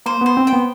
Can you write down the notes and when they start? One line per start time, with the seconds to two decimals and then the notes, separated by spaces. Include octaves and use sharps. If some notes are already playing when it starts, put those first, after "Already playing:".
0.06 A#3 C5
0.21 B3 C5
0.37 C4
0.47 G5
0.53 B3